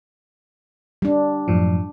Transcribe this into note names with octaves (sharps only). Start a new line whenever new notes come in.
G3 D4
F#2 A2 F3